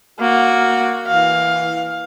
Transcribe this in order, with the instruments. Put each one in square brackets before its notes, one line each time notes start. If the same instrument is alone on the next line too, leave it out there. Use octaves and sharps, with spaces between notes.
[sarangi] A#3 [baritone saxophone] F#4
[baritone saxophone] E3 [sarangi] F5